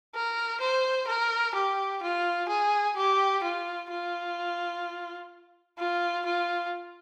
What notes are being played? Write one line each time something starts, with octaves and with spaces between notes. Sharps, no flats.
A#4
C5
A#4
G4
F4
G#4
G4
F4
F4
F4
F4